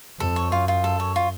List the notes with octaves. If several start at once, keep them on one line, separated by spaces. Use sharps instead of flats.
F2 A4
C#5
F#2 F4
F4
A4
C#5
F4